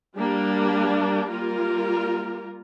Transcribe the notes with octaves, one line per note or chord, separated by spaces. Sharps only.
G3 A#3 D4
G3 A#3 F4 A#4